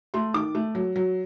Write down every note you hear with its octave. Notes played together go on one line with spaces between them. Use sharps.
A3 C6
D#3 D6
A3
F#3
F#3